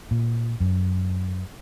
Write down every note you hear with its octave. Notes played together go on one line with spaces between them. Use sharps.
A#2
F#2